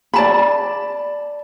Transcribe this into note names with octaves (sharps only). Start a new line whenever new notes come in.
D5 A5 B5